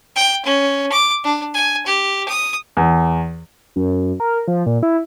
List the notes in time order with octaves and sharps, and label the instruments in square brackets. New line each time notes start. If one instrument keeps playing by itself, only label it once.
[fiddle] G5
C#4
D6
D4
G#5
G4
D#6
[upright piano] E2
[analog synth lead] F#2
A#4
F3
A#2
E4